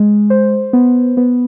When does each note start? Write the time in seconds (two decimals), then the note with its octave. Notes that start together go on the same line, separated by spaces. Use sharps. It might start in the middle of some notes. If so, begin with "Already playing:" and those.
Already playing: G#3
0.30 C5
0.73 B3
1.17 B3